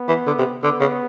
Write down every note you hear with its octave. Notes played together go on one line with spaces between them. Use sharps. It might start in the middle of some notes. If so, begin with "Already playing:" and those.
Already playing: B3
E3
D3
C3
D3 B3
C#3